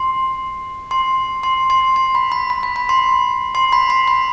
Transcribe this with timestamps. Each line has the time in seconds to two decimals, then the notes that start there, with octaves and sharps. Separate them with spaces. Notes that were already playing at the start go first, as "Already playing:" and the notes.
Already playing: C6
0.91 C6
1.43 C6
1.70 C6
1.96 C6
2.15 B5
2.32 B5
2.50 B5
2.63 B5
2.76 B5
2.89 C6
3.55 C6
3.73 B5
3.90 C6
4.08 B5